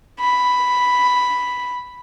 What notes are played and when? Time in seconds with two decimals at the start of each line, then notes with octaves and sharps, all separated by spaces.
0.20 B5